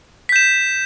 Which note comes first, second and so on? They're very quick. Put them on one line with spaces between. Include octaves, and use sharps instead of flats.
B6 G6 E7